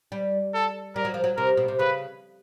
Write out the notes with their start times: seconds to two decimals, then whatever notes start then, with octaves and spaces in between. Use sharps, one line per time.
0.12 G3
0.54 A4
0.96 G3 A#4
1.05 F#3
1.14 F3
1.24 F#3
1.37 C3 A#4
1.57 B2
1.68 C3
1.79 C#3 B4